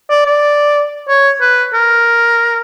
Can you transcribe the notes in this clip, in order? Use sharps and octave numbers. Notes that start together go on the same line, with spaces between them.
D5
D5
C#5
B4
A#4